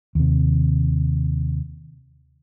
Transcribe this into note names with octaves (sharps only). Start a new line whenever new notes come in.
D#2 C3